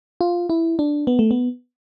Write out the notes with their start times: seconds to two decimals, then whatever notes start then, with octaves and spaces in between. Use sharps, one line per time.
0.21 F4
0.50 E4
0.79 D4
1.07 B3
1.19 A3
1.31 B3